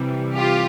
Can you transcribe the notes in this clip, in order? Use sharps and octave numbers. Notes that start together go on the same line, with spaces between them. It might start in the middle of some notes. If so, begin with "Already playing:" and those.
Already playing: C3 E3 G3
F4 G4